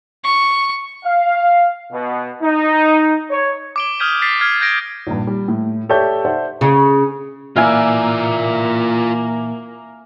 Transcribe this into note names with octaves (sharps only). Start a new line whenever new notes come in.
C#6
F5
B2
D#4
C#5
D6 D7 G7
D#6 F6 G6 G#6 B6 D#7
A6 B6 C7
F6 G#6 C7
G6 G#6 A#6 D7
A#1 G2
G3
A2
G4 A4 C#5 D5 E5 G6
C5 D5 E5 F#5 A5
C#3
A#2 E3 A#3 F4 A#4 D5 E5 G#5